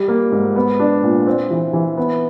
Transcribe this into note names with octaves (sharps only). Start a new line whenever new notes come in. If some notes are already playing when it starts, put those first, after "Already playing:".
Already playing: G3
A#3
G#2
B3
D4
A#2
C4
E3
E3
B3